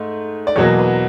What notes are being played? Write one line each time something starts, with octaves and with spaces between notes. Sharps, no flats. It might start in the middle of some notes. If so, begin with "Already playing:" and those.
Already playing: G#2 A3
D5
E2 B2 F#3 A#3 C#5
B4